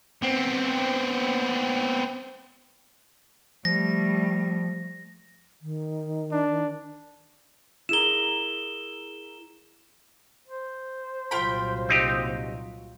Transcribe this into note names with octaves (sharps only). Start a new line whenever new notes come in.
B3 C4
F3 G3 A3 A#6
D#3
D4
E4 G#4 A#4 E7 G7
C5
C2 A#2 F#3 F4 G5 B5
C4 D#4 G4